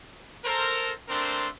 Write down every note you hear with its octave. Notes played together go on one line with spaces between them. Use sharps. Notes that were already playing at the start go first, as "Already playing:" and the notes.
A4 A#4 C5
A3 C4 D4 A#4 C5 C6